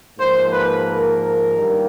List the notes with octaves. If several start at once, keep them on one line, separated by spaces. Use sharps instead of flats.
G#2 F3 A#3 C5
B4
A#4
G2 D#3 G3 A#3